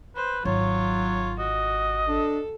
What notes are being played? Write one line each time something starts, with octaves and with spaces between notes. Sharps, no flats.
B4 C5
G#1 F#3 F4 C#5
F#4 D#5
D4 A4